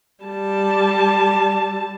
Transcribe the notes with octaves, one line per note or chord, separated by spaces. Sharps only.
G3 A5